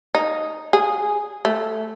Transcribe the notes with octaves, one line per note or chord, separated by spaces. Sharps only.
D#4
G#4
A3